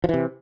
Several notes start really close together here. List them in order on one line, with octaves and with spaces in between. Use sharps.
F3 E3 C3